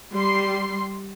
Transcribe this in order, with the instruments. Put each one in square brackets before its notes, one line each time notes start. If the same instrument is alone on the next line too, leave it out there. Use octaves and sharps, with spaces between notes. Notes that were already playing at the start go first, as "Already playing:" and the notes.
[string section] G3 C6